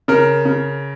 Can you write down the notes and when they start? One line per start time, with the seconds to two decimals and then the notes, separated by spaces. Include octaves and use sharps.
0.08 C#3 A#4
0.45 C#3